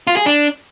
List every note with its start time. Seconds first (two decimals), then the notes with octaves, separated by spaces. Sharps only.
0.07 F4
0.17 G#4
0.26 D4